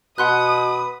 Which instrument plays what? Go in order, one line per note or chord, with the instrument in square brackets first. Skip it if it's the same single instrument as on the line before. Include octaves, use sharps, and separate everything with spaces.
[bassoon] B2 [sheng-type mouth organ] B4 [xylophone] F#5 C6 F#6 [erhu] D#6